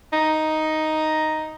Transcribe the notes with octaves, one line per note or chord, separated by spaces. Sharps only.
D#4